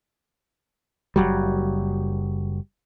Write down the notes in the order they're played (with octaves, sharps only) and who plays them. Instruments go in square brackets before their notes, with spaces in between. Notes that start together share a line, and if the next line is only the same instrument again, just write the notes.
[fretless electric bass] F#1 C#2 F#3 G3